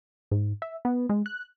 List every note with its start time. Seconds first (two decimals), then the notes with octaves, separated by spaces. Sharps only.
0.31 G#2
0.62 E5
0.85 B3
1.09 G#3
1.26 F#6